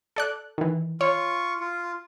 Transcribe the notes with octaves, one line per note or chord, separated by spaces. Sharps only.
A4 D5 F#6
D#3 E3
F4 C#5 C#6
F4